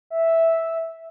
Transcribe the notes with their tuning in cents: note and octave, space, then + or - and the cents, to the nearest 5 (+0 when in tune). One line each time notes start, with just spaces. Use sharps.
E5 -5